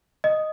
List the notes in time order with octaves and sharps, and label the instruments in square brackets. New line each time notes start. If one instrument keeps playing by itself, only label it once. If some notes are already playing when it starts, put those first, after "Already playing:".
[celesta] D#5